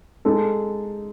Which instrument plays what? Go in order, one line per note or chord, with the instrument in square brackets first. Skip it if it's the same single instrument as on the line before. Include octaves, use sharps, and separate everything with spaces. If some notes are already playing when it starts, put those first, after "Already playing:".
[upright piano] G#3 D#4 A4